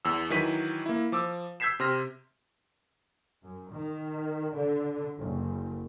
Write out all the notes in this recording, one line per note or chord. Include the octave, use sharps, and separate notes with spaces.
E2 E6
D#3 E3 F#3 B6 D#7
A#3 E4
F3 D6 E6
E6 G6 G#6 B6 C7 E7
C3 C6 F6 A#6
F#2
D#3
D3
F#1